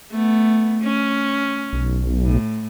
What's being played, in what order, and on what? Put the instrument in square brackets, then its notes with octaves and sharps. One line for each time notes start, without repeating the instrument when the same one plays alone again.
[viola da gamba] A3 B3
C#4
[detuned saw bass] B1
[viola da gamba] A2